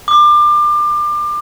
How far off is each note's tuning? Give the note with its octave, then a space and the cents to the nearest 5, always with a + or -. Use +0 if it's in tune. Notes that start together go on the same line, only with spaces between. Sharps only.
D6 +30